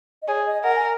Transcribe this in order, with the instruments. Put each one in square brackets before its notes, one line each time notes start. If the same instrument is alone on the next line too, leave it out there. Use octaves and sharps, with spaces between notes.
[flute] D#5
[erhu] G#4 [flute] C#5
[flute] D#5
[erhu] A#4 [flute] F#5
[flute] G#5